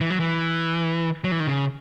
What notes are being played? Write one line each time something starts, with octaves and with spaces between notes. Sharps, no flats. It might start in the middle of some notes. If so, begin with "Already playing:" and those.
E3
F#3
E3
F#3
E3
D#3
C#3